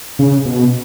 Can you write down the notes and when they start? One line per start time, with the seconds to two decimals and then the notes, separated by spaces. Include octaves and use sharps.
0.19 C#3
0.45 B2